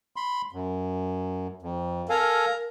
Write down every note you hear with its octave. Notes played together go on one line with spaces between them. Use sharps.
B5 C6
F#2
F2
A4 A#4 F5 G#5